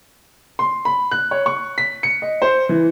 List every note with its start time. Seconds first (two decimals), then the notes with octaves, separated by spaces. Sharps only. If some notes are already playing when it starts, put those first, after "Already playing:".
0.59 C6
0.85 B5
1.11 F#6
1.31 C#5
1.46 C#6
1.78 B6
2.03 C#7
2.22 D#5
2.42 C5
2.69 E3